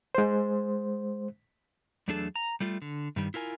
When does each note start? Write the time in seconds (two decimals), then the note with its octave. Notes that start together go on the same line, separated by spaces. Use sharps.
0.15 G#3 C5
2.08 E2 F#3 A3 D4 G#4 A4
2.36 A#5
2.60 G3 A3 F4
2.82 D3
3.16 G2 D#3 G3
3.34 E4 F4 A#4 G#5